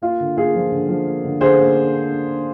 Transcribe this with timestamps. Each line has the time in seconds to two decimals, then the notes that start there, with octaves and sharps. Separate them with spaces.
0.02 A#3 F4
0.20 D3
0.37 A#3 F4 G#4
0.55 F3
0.72 D3
0.89 F3
1.07 A#3
1.24 D3
1.41 D3 G#4 C5
1.59 A#3